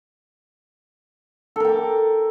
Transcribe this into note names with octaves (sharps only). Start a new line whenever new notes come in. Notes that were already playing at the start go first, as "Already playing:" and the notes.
A4 A#4 G5 D6